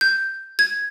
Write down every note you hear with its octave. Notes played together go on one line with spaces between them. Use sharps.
G6
G#6